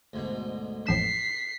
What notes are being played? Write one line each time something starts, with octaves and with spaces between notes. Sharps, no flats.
D2 G#2 B2
A1 F2 B6 C7 E7